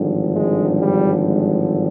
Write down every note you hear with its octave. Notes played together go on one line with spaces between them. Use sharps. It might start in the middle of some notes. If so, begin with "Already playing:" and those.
Already playing: G#1 G2 D3 F3
G#3
G3
G#3